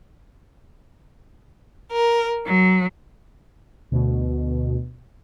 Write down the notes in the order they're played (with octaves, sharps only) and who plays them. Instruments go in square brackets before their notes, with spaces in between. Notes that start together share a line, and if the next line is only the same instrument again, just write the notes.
[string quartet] A#4
F#3
[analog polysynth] D2 B2